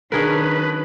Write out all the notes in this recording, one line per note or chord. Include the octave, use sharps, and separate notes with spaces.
D#3 F#3 C#4 D4 G#4 A#4 B4